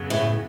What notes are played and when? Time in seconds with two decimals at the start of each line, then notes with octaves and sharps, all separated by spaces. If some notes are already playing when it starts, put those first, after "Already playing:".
Already playing: F#2 C#3 F#3 B3
0.10 A2